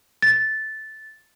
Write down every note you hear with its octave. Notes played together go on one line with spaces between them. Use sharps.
A6